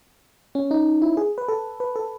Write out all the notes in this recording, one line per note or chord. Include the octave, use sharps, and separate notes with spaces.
C#4
D#4
E4
G#4
B4
A4
B4
A4